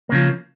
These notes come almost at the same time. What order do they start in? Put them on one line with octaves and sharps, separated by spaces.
A#3 C#3 F3